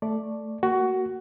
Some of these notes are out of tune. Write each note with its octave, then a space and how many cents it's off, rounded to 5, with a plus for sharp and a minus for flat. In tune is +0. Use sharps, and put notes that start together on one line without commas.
A3 +0 D5 +0
A#3 +0 F#4 +15